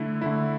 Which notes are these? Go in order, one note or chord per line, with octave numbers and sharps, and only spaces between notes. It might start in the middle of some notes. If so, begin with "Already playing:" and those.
Already playing: D3 A3 E4
D3 A3 E4